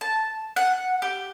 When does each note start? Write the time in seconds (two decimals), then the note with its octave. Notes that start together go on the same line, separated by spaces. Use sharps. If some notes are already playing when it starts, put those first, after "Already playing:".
0.01 A5
0.56 F#5
1.02 G4